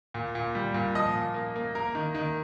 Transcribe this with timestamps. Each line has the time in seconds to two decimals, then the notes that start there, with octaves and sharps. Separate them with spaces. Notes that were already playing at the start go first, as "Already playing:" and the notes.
0.14 A#2
0.35 A#2
0.55 G3
0.74 A#2
0.95 F3 D#5
1.15 A#2
1.34 A#3
1.56 A#3
1.75 A#3 A#4
1.95 D#3
2.15 D#3